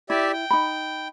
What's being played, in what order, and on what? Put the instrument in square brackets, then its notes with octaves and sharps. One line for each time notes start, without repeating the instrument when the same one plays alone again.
[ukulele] E4 [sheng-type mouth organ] G4 D5 E5
[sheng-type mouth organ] G5
[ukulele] D#4 B5